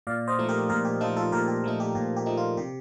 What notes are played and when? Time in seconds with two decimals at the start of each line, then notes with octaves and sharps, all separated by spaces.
0.07 A#2 D5 F5
0.27 C5 D#5
0.39 F3 A3 D#4
0.49 G4 A#4
0.69 A#2 G4 A#4
0.85 G4
1.00 F3 A3 D#4 F4 A4
1.17 F4 A4
1.32 A#2 G4 A#4
1.48 G4
1.64 F3 A3 D#4
1.80 G4
1.95 A#2 G4
2.16 G4
2.26 F3 A3 D#4
2.37 F4
2.57 C3 G4